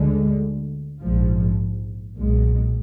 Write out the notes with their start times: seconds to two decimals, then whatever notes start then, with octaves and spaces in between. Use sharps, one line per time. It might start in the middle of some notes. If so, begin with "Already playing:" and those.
Already playing: D2 D3 G#3
1.01 A#1 G#2 F3
2.16 B1 A#2 G#3